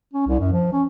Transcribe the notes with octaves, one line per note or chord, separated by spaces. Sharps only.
C#4
C2
F#2
F3
C#4